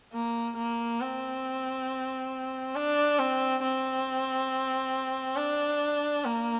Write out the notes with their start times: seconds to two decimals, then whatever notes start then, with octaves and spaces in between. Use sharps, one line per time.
0.13 A#3
0.57 A#3
1.00 C4
2.75 D4
3.19 C4
3.63 C4
5.36 D4
6.24 A#3